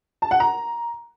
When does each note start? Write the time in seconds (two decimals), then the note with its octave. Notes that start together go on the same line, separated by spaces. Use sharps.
0.22 A5
0.31 F#5
0.40 A#5